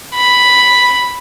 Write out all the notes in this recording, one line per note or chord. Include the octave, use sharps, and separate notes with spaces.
B5